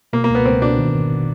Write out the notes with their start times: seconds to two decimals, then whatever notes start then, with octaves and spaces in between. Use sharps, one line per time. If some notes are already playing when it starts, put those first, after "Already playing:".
0.13 B2 A#3
0.24 A#3
0.29 C#2
0.35 B3
0.45 C#2 C4
0.62 B2 D4
0.79 D#3
0.94 G#1